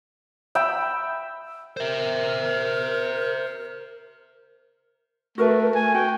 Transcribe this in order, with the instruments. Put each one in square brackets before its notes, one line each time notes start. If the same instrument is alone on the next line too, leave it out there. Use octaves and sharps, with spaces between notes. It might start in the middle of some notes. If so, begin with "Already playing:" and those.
[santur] E5 G5 B5
[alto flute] A#4 [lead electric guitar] C5 E5
[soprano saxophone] A3 [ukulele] F#4 A#4 B4
[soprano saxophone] G#5
[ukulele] F#4 [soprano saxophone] G5